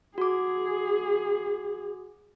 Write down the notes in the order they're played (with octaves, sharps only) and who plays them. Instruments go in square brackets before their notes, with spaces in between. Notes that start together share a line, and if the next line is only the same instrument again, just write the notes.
[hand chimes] F#4 D6 [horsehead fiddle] G#4